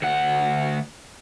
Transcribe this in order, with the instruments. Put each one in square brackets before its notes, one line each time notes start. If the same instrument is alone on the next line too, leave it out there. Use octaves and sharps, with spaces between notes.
[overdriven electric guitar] D2 F#5